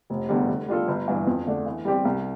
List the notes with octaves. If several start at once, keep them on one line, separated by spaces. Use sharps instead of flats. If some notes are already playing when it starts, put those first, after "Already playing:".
F1
E2 D3 G3
D3
G3 D4 F4 A4
G1
G2 E3
F2
D3 A3 D4
E3
G3 C4 G4 D5
C2